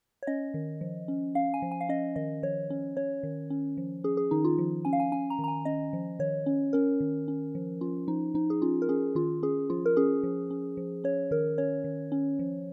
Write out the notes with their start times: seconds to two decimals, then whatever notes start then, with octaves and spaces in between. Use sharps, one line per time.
0.23 C#5
0.27 C#4 D#5
0.54 D#3
0.81 F3
1.08 C#4
1.35 C#4 F5
1.54 G#5
1.62 F3
1.71 G#5
1.81 F5
1.89 C#4 D#5
2.16 D#3 D#5
2.43 F3 C#5
2.70 C#4
2.97 C#4 C#5
3.23 D#3
3.50 C#4
3.77 F3
4.04 C#4 G#4
4.17 G#4
4.31 D#3 D#4
4.45 F4
4.58 F3
4.85 C#4 G#5
4.93 F5
5.00 G#5
5.12 C#4 G#5
5.30 A#5
5.39 D#3
5.44 A#5
5.48 G#5
5.65 C#4 D#5
5.93 F3
6.19 D#3 C#5
6.46 C#4
6.73 C#4 A#4
7.00 D#3
7.28 C#4
7.55 F3
7.81 C#4 F4
8.07 F3 D#4
8.34 F3 D#4
8.50 G#4
8.62 C#4 F4
8.82 A#4
8.89 C#4 G#4
9.15 D#3 F4
9.43 C#4 G#4
9.70 F3 F4
9.86 A#4
9.97 C#4 G#4
10.23 F3
10.50 C#4
10.77 F3
11.04 C#4 C#5
11.31 D#3 A#4
11.58 C#4 C#5
11.84 D#3
12.12 C#4
12.39 F3